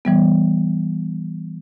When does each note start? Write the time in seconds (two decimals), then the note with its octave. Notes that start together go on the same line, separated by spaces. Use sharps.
0.05 E3 G3 B3